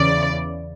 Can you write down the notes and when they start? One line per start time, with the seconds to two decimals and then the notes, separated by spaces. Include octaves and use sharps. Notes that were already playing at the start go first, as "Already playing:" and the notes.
Already playing: E2 C#3 E3 D5